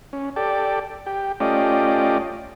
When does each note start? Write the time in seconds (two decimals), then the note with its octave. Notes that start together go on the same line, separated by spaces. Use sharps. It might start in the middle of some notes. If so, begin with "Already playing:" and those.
0.13 C#4
0.36 G4 A4 D5
1.06 G4
1.40 A3 C#4 F4 G4 D5 D#5